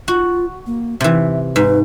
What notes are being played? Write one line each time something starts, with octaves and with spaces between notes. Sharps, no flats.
F4 F#4
A#3
C3 E3 E5
G#2 B4